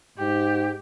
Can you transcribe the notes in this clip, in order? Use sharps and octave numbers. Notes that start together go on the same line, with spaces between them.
G#2 G4